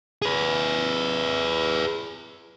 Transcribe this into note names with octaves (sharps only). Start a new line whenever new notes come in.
G#4 B4